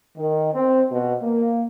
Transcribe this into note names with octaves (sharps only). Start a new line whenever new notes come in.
D#3
C4
B2
A#3